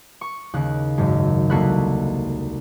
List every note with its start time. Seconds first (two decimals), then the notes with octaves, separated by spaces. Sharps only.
0.21 C#6
0.54 D#2 C#3 F#6
0.98 G#1 F#2
1.50 C2 A#3 F#4 A4 B5 F#6